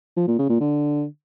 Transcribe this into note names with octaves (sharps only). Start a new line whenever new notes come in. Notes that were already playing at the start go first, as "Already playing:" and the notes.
F3
A#2
C#3
A#2
D3